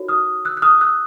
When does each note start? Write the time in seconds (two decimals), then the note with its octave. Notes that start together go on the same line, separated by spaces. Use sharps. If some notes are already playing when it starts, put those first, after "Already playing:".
Already playing: D#4 F#4 A#4 C#5
0.08 D#6 F6
0.45 E6 F#6
0.57 F#6
0.62 D#6 F6
0.81 E6 F#6